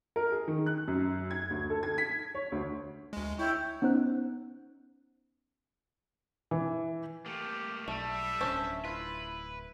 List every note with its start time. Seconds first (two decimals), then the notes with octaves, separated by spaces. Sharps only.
0.16 A#4
0.32 G#4
0.48 D#3
0.66 F#6
0.88 F#2
1.31 G#6
1.50 D2
1.70 A4
1.83 G#6
1.98 B6
2.35 C#5
2.52 D2
3.13 D2 G#3
3.39 E4 C#5 E5 G5
3.82 B3 C#4 D#4 C5 F#6
6.51 E3
7.26 A3 A#3 G4
7.88 B1 G3 A3 E5
8.41 D1 C#4 D4 A4 C5
8.85 E4 F4 B4